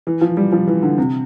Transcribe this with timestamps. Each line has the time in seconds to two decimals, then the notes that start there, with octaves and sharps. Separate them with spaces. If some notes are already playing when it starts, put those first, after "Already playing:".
0.07 E3
0.21 F3
0.37 G3
0.52 F3
0.67 E3
0.83 D3
0.98 C3